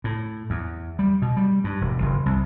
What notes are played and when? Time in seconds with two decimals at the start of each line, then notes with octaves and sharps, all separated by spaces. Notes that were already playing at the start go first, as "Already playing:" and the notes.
0.04 A2
0.50 E2
0.99 G3
1.22 B2
1.37 G3
1.64 G2
1.81 E1
2.02 F#1
2.26 C2